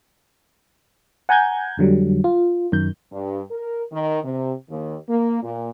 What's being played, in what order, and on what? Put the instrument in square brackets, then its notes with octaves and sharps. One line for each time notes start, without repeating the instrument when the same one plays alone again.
[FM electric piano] F#5 G#5 A#5 G6 G#6
F2 D3 F#3 G3
F4
F#2 D#3 G6
[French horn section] G2
A#4
D#3
C3
D#2
A#3
A#2